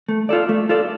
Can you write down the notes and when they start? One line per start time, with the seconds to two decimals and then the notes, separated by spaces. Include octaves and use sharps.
0.09 A3
0.29 F4 A4 D5
0.49 A3
0.69 F4 A4 D5